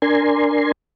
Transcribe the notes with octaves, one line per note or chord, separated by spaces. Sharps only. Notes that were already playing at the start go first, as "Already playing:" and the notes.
D4 A#4 G#5 C6